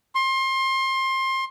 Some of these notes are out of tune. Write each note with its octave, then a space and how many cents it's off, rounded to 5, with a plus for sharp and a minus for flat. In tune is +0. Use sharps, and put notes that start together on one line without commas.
C6 +25